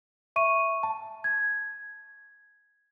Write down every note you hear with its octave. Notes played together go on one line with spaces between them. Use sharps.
E5 C#6 D#7
A5
G#6